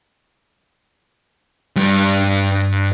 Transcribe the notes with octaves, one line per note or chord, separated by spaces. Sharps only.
G2 G3